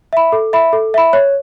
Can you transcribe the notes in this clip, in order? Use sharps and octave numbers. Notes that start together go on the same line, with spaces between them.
E5 B5
A4
E5 B5
A4
E5 B5
C#5